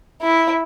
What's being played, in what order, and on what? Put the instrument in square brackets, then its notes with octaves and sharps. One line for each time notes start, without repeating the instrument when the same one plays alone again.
[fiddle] E4